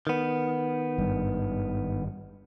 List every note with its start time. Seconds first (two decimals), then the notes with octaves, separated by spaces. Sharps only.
0.07 D#3 B3
0.98 G#1 G2